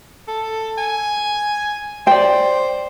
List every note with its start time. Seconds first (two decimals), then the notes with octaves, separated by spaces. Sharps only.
0.28 A4
0.78 G#5
2.07 C5 D5 G5